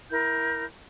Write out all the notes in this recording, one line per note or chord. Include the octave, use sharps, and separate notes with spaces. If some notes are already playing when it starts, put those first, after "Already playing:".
E4 A#4 G6